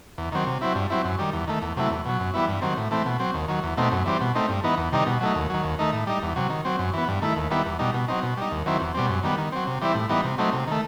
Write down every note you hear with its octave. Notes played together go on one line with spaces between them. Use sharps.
E2
D#3 F#3 C4
C3
F#3 C4 E4
G2
F#3 C4 E4
F#2
D#3 G3
E2
D#3 A3
E2
C3 F#3 A3 E4
E2
B2 F#3
F#2
E3 G3 B3 E4
G2
D#3 F#3 C4
A2
E3 A3 C4
B2
F#3 C4
D#2
D#3 F#3
E2
B2 A3 C4 D#4
F#2
E3 G3 C4
B2
A3 C4 D#4
G2
E3 B3 D#4
E2
C3 D#3 G3 D#4
B2
F#3 A3 D#4
D#2
D#3 F#3
D#2
D#3 A3 D#4
A2
G3 D#4
E2
C3 F#3
D#3
F#3 C4
F#2
E3 B3
G2
D#3 A3 E4
D#2
D#3 G3 B3 E4
E2
B2 G3 D#4
B2
F#3 C4 D#4
B2
G3 D#4
D#2
D#3 F#3 C4 E4
E2
B2 G3 C4
F#2
D#3 G3 B3
D#3
F#3 C4
C3
E3 G3 C4 E4
A2
E3 G3 B3 D#4
C3
F#3 A3 C4 D#4
C3
D#3 A3